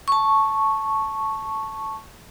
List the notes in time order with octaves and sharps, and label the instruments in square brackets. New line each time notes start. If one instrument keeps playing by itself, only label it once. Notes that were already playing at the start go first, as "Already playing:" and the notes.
[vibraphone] A5 C#6